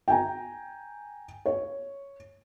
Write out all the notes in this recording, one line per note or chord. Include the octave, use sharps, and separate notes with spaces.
G5 G#5 A#5
C#5